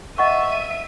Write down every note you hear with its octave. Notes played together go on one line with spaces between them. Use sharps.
D#5 E5 F#5 C#6 D#7